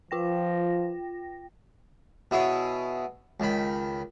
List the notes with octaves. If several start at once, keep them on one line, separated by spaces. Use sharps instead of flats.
F3 F4 G5 A#6
B2 E4 G#4 C#5
C#2 D#3 B5